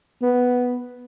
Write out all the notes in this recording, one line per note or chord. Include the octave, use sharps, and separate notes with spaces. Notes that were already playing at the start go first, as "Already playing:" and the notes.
B3